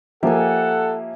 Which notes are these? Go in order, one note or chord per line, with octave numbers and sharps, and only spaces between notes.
F3 A#3 G4 A4 E5 F#5 G#5